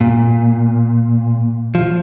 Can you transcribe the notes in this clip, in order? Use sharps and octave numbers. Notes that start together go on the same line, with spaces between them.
A#2
F3